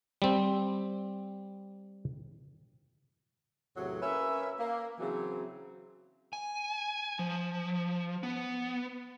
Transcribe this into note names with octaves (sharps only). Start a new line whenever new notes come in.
G3 C4
E2 A2 C3 F#3
A#3 C#4 B4 E5
A#3
C#3 E3 F#3 C4
G#5
F3
B3